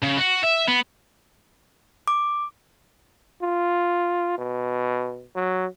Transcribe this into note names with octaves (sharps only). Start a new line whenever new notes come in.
C#3
F#4
E5
B3
D6
F4
B2
F#3